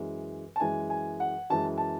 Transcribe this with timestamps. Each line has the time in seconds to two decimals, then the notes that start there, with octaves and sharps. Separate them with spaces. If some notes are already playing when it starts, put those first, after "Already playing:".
Already playing: F#2 E3 G#3
0.56 A5
0.60 F#2 E3 G#3 G#5
0.90 G#5
1.20 F#5
1.50 F#2 E3 G#3 A5
1.78 A5